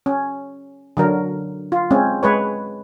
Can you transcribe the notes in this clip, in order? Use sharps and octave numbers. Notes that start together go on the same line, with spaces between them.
C#4
D3 F#3 A#4
F4
G#3 C4 C#4
G#3 B4 C#5